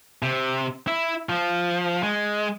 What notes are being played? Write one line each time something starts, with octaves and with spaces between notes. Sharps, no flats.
C3
E4
F3
G#3